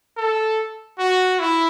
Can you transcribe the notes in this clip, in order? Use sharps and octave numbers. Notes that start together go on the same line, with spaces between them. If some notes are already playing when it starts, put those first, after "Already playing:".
A4
F#4
E4